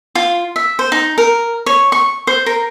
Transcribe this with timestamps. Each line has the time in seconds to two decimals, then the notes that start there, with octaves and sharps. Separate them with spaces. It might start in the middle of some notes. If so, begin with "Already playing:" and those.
0.15 F4
0.56 E5
0.79 C5
0.92 D#4
1.18 A#4
1.66 C#5
1.92 C#6
2.27 C5
2.46 A#4